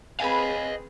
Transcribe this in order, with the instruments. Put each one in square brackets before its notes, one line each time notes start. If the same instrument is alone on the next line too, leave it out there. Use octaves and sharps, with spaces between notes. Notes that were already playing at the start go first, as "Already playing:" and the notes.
[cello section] C4 G#4 B4 [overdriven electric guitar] D#5 F5 [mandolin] G#5 A5 B5